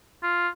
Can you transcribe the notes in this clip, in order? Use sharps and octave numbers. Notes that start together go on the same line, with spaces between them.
F4